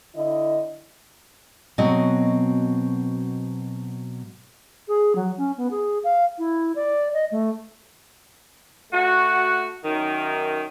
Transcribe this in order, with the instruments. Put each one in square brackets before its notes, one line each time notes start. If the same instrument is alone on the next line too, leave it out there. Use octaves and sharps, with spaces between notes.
[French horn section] D3 E4 D#5
[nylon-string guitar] B2 F#3 C4 F#4 D#5
[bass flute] G#4
F#3
C#4
B3
G#4
F5
E4
D5
D#5
A3
[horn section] A3 F#4
F#2 D#3